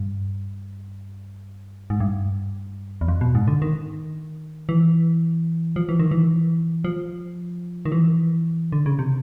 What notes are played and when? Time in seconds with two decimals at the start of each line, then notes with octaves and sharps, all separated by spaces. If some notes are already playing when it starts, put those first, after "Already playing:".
Already playing: G2
1.90 G#2
2.00 G2
3.01 E2
3.08 F2
3.21 B2
3.35 G#2
3.48 D3
3.62 D#3
4.69 E3
5.76 F3
5.89 E3
5.99 D#3
6.11 E3
6.84 F3
7.85 D#3
7.92 E3
8.72 D3
8.86 C#3
8.99 C3